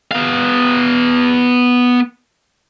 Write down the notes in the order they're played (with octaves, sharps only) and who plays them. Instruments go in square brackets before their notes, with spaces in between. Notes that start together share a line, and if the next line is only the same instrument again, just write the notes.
[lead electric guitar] B3 F5